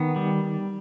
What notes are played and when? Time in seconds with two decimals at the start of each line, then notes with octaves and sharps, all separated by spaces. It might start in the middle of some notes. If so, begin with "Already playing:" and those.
Already playing: D#3 B3
0.16 G3